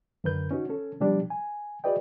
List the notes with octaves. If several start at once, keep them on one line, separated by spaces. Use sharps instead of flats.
F#2 D3 A#4 B4 G6
C#4 D#4 F#4
C#4 A4
B2 F3 G3 D4 G4
G#5
F#4 G#4 B4 D5 D#5 G5